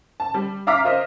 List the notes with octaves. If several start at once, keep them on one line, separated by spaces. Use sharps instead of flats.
A5
G3
E5 F5 A#5 D6 F6 B6
F4 A#4 C5 D#5